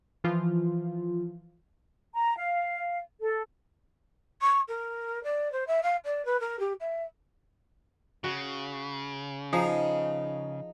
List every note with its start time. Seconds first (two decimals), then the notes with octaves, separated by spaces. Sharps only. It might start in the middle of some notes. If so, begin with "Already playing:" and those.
0.24 E3 F3 F4
2.14 A#5
2.38 F5
3.21 A4
4.41 C#6
4.68 A#4
5.23 D5
5.52 C5
5.67 E5
5.82 F5
6.04 D5
6.25 B4
6.40 A#4
6.59 G4
6.80 E5
8.24 C#3 F#4
9.53 F3 D#4 G#4